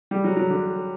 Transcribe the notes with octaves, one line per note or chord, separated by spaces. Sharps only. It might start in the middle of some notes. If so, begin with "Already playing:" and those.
G3
F#3
F#3
D3